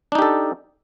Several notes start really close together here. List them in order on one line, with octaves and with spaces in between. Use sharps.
D4 D#4 G4 A4